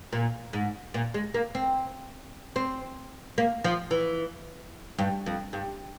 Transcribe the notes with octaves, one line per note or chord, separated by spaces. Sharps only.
A#2
G#2
A#2
G#3
A#3
C4
C4
A#3
F3
E3
G2
F2
G2